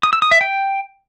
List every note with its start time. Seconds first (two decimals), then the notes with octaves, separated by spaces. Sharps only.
0.03 D#6
0.13 E6
0.22 D#6
0.31 E5
0.41 G5